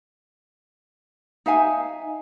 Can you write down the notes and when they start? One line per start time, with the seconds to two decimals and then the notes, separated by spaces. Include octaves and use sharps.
1.46 D#4 E5 F5 G#5